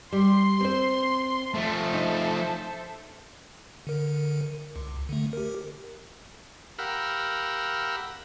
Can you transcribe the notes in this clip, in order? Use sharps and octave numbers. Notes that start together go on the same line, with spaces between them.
G3 C6
C4 C5
F3 A3 A4 C5 E5
D#4
D3 A#4
C#2
D3 A3
G4 A#4
G4 A#4 F5 F#5 B5 E6